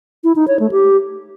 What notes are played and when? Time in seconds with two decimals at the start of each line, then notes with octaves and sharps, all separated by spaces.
0.24 E4
0.36 D#4
0.48 C#5
0.60 A3
0.71 G4